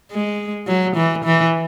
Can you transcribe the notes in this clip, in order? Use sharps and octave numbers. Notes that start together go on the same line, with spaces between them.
G#3
F#3
E3
E3